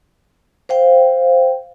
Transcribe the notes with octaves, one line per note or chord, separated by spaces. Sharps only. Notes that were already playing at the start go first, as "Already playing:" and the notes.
C5 F5 G5